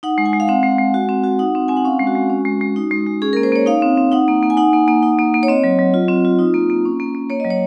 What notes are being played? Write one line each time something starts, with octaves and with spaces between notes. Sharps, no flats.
D#4 F#5
G#3
G#5
G#3
F5
C4 F#5
G#3
G#3
F#4
C4
F#4
D#4 F#5
C4
C4 G#5
F#5
C#4 F5
G#3
F#4
G#3
C#4
G#3
G#3
D#4
G#3
G#3
C#4 G#4
A#4
A#3
C5
A#3 C#5
D#4 F5
C4
C4
D#4 F#5
A#3
A#3
G#5
D#4 F#5
A#3
A#3
D#4
A#3
A#3
C#5
C4 D#5
F#3
F#3
F4
C4
F4
D#4
A#3
A#3
C#4
A#3
A#3
A#3 C#5
D#5
F#3
C#5